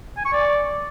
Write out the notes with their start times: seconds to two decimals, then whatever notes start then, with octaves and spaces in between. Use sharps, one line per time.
0.17 G#5
0.25 C#6
0.33 D5